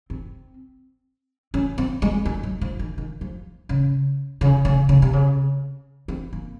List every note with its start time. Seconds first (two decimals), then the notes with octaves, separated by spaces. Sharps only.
0.10 C4
1.54 C#4
1.78 C4
2.02 G#3
2.25 G#3
2.43 F#3
2.61 F3
2.79 D#3
2.98 D#3
3.21 F3
3.69 C#3
4.41 C#3
4.65 C#3
4.89 C#3
5.02 C3
5.13 C#3
6.08 C4
6.33 A#3